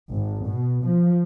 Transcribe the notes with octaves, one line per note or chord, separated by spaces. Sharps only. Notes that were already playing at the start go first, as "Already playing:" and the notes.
G#1
B2
F3